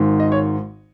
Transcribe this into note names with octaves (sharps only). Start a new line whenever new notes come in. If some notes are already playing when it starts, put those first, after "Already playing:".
Already playing: G#1 G#2 D#3
D#5
C#5